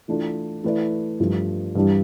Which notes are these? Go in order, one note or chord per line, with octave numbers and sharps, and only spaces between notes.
E3 A3 D4 F4 A4
E3 A3 E4 B4 D5
G2 F3 A3
G2 E3 G3 D4